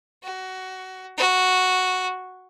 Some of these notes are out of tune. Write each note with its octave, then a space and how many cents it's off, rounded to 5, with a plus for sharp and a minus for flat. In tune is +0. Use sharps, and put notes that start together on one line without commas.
F#4 +20
F#4 -5